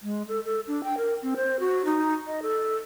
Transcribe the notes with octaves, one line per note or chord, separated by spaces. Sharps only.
G#3
A4
A4
D4
G5
A#4
C4
C5
F#4
D#4
D#5
A4